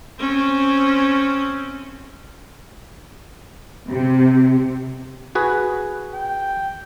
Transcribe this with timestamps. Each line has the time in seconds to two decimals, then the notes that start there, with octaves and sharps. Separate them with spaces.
0.19 C4 C#4
3.88 C3
5.35 F#4 G#4 B4
6.14 G5